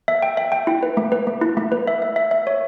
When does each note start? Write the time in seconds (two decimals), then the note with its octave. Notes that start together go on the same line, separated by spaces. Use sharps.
0.08 E5
0.22 G5
0.37 E5
0.52 G5
0.67 E4
0.83 B4
0.97 A3
1.12 B4
1.27 A3
1.41 E4
1.57 A3
1.72 B4
1.87 E5
2.02 E5
2.16 E5
2.31 E5
2.47 C#5